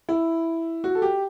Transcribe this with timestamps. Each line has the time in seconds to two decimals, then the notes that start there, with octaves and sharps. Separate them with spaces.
0.09 E4
0.84 F#4
0.95 A4
1.02 G4